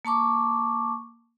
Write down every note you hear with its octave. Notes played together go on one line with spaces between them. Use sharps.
A#3 A5 C#6 D6